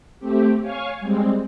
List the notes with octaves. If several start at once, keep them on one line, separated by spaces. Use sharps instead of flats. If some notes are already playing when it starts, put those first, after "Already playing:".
A3 C4 G4
C#5 F5 G#5 C#6
G3 G#3 C4